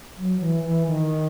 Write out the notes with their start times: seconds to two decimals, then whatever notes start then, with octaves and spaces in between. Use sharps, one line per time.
0.17 F#3
0.40 E3
0.64 E3
0.87 D#3